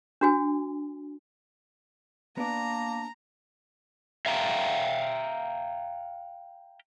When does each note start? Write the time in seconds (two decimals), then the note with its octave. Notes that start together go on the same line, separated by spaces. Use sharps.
0.21 D4 F#4 G#5
2.37 A#3 B3 D4 D5 A5 A#5
4.26 E5 F5 G5 A#5